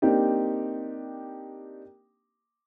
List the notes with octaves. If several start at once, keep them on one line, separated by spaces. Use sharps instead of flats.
A#3 C4 D4 D#4 G4 G5